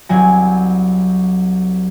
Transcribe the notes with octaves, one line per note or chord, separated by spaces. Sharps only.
C2 F#3 G#5